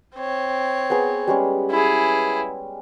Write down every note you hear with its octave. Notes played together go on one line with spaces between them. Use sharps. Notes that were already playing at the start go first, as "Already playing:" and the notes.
C4 C#5
B3 G#4
G3 G#3 C#4
E4 G#4